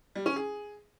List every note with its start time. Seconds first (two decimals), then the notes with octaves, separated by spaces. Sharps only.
0.15 G3
0.26 C#4
0.36 G#4